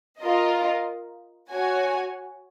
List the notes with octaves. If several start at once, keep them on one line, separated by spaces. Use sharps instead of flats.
F4 A#4 D#5
F#4 C#5 G#5